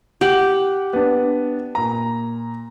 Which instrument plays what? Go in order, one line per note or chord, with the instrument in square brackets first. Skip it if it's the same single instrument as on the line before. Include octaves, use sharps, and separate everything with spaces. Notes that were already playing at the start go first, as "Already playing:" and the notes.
[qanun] G4 [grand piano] F#5 F#7
[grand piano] B3 D4
A#2 A#5